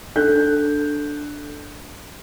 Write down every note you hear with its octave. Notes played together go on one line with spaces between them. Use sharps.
D4 A4 F#6 G6